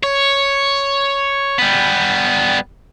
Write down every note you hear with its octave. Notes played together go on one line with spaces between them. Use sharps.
C#5
G3 B3